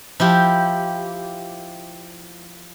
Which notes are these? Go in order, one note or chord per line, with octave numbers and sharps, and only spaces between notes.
F3 E4 G4